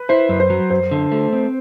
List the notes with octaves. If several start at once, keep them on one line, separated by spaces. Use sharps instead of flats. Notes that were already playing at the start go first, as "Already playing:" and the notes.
Already playing: B4
E4 C5
F#2
C5
F#3
F#2 C5
D3
A3
C4